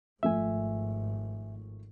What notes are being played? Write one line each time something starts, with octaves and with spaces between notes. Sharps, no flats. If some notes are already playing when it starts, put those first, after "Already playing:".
G#1 G#2 F3 A3 E5 G#5